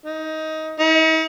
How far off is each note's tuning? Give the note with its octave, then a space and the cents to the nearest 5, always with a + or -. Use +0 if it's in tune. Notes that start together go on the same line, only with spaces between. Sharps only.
D#4 +15
D#4 +45